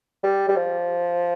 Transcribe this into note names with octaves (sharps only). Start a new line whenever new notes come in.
G3
G3
F3